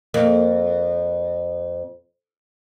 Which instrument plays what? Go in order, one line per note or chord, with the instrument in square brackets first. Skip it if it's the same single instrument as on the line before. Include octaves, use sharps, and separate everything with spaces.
[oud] F2 A#3